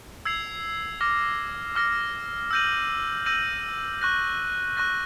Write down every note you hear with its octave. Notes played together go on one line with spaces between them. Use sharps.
E6 G#6 C7 F7
D6 F6 A#6
D6 F6 A#6
E6 G6 A#6 D#7 F#7
E6 G6 A#6 D#7 F#7
C#6 F#6 A#6
C#6 F#6 A#6